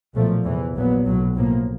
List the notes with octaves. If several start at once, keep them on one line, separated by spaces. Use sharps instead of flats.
B1 A#2 F3 A3
E2 C3 E3
A#1 A#2 F#3 B3
B1 A2 F#3
B1 A2 F3 A#3